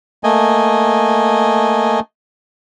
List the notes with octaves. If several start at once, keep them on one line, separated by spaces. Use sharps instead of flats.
A3 A#3 D#5 G#5